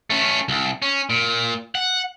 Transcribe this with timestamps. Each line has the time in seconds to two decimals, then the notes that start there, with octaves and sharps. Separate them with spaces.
0.10 A3 C#4
0.48 C2
0.82 C#4
1.10 A#2
1.75 F#5